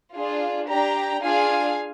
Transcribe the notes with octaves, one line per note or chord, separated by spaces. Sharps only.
D4 F4 G#4
D4 G4 G5 A#5
D4 F4 G#4 F5 G#5